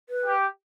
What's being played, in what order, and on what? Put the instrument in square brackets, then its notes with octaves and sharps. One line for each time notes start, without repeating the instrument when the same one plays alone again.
[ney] B4
[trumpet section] G4